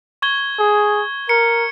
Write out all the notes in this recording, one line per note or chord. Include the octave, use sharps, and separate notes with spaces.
C#6 G#6 G7
G#4
A#4 C#7